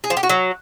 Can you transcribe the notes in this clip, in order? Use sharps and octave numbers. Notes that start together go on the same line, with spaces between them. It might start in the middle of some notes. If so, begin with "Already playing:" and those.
G#4
F3
G4
F#4
F#3